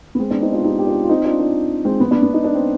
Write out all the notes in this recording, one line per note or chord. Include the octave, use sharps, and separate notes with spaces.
B3
G#3 C4
B3 D4
C4 D#4
D4 F4
D#4 G4
G4
D4 F4
F4
C4 D#4
D4 F4
D4 F4
G#3 C4
B3
B3 D4
B3
D#4
D4
C4